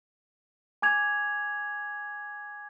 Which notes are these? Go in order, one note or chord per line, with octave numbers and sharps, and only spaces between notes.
G#5 D6 G#6 F7